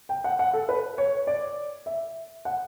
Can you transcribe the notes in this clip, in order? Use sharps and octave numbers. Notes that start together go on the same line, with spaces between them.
G5
F#5
F#5
A4
B4
C#5
D5
E5
F#5